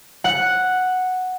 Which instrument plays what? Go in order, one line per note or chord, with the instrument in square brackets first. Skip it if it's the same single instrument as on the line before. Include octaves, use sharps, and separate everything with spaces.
[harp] F#5 F#6